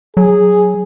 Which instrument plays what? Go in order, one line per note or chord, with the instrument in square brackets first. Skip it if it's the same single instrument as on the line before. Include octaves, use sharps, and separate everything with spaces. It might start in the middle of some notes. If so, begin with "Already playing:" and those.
[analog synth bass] F#3 [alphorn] G#4